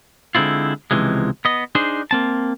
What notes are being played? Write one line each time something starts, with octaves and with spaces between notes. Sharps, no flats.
D3 G#3 C4 E4 F4
C#2 C3 E3 F3 G#3
B3 D#5
D4 D#4 G#4 C5
A#3 C4 A5